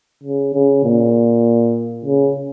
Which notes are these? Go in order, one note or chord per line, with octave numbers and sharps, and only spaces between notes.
C#3
C#3
A#2
C#3